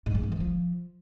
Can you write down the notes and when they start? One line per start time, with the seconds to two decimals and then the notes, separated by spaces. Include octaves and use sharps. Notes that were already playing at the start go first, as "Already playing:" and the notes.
0.06 G#2
0.15 G3
0.23 B3
0.32 E3
0.40 F3